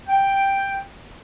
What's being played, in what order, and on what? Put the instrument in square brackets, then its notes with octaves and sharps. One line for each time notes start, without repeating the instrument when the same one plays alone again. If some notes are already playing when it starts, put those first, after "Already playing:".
[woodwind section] G5